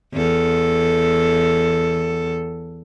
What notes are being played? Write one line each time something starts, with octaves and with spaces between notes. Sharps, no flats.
E2 A4